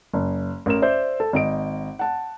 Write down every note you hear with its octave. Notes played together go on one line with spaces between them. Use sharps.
F#1
A1 A#4 E7
C5 D5 E5 G6
A4 A5
G#1 D#5 D7
F#5 A5